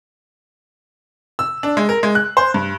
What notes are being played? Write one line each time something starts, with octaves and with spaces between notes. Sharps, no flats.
E6
D4
G#3
A#4
G#3
F#6
C5
G2